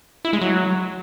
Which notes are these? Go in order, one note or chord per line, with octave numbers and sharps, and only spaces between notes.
E4
G#3
F#3